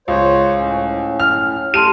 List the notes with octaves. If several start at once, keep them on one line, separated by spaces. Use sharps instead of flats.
C#2 C5 C#5 F5
A2 C#4
F6
A3 G4 A5 C6 F6 D#7